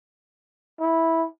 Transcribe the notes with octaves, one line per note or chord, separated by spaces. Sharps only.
E4